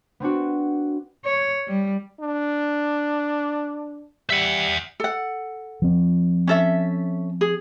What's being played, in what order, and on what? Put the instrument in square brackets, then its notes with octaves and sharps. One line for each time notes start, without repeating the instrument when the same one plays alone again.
[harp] B3 C4 D4 F#4
[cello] C#5
G3
[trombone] D4
[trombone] G3 [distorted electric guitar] E5 F#5
[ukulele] A4 F#5
[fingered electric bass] F3 C4
[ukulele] C#4 A4 E5
G#4